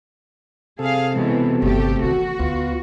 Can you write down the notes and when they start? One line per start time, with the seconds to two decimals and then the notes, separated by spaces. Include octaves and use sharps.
0.79 C3 G#4 A4 F5
1.14 B2 E3 G#3
1.62 G1 D#3 A3 G4
2.03 D#3 E3 F#4
2.39 D2 B3 F4